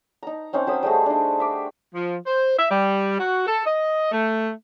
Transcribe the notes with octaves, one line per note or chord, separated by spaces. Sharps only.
D#4 A#5
C4 C#4 D#4 C5
F#3 C5 B5 D#6
G3 A3 F#4 G#4
D4 D#4
E5 D6
F3
C5
E5
G3
F#4
A4
D#5
A3